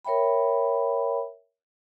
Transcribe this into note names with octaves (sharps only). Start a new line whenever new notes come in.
A#4 C#5 E5 G5 B5